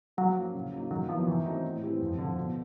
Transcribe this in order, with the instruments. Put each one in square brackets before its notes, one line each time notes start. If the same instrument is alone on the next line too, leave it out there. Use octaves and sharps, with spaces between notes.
[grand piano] F3 [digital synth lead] F#3
[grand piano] A#3 C#4 F#4
C#3
F#3 A#3 D#4
[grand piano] D#3 [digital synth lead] F#3
[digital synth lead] F3 [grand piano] F#3 B3 E4
[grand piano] D#3 [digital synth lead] E3
[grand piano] F#3 A3 C4 D#4
A2
E3 G3 C4 E4
F2
D3 F3
B2